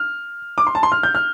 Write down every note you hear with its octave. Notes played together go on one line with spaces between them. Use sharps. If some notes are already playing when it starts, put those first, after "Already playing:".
Already playing: F6
D6
C6
A5
C6
F6
G6
F6